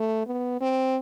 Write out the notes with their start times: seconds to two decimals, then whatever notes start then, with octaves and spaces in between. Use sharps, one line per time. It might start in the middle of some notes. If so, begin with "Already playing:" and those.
Already playing: A3
0.27 B3
0.61 C4